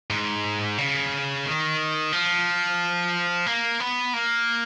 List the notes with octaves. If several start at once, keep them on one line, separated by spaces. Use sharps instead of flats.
G#2
C#3
D#3
F3
A#3
B3
A#3